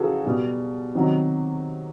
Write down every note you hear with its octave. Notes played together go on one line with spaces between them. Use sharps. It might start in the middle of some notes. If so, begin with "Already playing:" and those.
Already playing: C#3 F#3 F#4 G#4 A4
B2 G3
C3 D#3 F#3